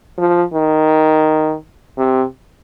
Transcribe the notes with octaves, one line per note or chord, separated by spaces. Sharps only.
F3
D#3
C3